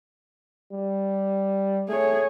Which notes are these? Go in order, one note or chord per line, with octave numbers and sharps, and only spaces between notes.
G3
A3 G#4 C#5